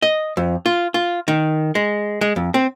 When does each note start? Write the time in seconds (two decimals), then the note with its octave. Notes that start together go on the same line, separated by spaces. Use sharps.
0.02 D#5
0.37 F2
0.66 F4
0.94 F4
1.28 D#3
1.75 G#3
2.21 G#3
2.36 F2
2.54 C4